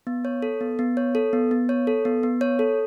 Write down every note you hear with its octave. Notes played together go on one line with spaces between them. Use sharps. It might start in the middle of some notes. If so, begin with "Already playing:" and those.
B3
C#5
A4
B3
B3
C#5
A4
B3
B3
C#5
A4
B3
B3
C#5
A4